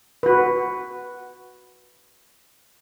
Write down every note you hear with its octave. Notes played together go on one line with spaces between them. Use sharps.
F#4 B4